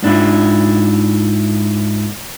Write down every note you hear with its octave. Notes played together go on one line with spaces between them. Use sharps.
G#2 D4 E4 F4